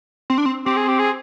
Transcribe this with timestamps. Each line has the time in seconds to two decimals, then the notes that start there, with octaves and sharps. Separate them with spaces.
0.30 C4
0.38 D4
0.46 C4
0.66 C4 G4
0.76 G#4
0.88 G4
0.99 G#4